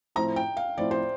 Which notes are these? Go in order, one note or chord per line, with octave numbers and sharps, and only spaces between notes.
A2 F3 C4 E4 A#5
G5
F5
A2 F3 C4 E4 D5
C5